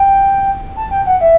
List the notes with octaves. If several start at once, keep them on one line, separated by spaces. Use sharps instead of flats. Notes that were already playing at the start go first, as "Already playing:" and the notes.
Already playing: G5
A5
G5
F#5
E5